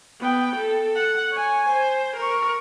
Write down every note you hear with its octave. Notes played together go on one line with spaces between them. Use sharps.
B3 G5
A4
F#5
C#5 G#5
C5
A#4 C#6